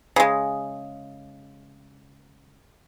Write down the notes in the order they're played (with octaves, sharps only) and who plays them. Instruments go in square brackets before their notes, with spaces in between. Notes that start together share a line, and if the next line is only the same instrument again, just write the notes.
[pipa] C#3 G#3